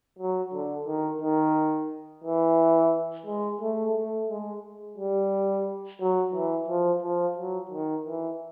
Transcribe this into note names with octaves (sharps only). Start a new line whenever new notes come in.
F#3
D3
D#3
D#3
E3
G#3
A3
A3
G#3
G3
F#3
E3
F3
F3
F#3
D#3
E3